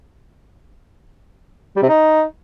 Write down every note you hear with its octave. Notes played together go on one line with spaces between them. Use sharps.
G3
C3
D#4